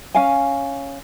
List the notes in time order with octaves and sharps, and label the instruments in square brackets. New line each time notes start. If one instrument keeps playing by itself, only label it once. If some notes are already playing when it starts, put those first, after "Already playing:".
[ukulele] C#4 F5 G#5